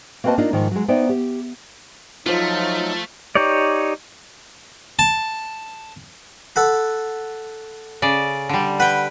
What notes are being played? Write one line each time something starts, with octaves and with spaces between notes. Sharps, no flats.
A#3 C4 F#4 B4 D#5 A5
A#3 D4 D#4 F4
G#2 D#3 F3
F#3 G#3
B3 D#4 C5 D5 E5 G5
G4
F3 F#3 A3 D#4 F4 C5
D#4 G4 C#5 D5
A5
A4 F#5 B5
C#3 D5
D3 G3
B4 F#5 G5